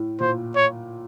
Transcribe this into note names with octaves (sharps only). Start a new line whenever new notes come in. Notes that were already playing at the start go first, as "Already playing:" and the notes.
Already playing: A2
A#2 C5
C#5